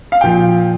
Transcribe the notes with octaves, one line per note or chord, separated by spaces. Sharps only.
F5
A#2 F3 G5